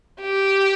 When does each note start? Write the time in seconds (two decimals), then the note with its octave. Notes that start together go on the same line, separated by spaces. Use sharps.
0.21 G4